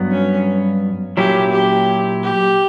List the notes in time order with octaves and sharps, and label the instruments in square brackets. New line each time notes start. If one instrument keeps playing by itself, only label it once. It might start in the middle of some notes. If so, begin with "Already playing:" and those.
Already playing: [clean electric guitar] G2 F#3 B3
[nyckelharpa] C#4
[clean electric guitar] A#2 F#3 C#4 E4 [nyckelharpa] G4
[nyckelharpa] G4
G4